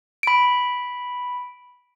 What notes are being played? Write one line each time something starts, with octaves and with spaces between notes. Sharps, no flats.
B5 D7